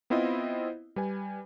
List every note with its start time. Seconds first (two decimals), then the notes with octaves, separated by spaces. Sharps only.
0.10 B3 C4 E4 F4 C5 D#5
0.96 G3 B4 G#5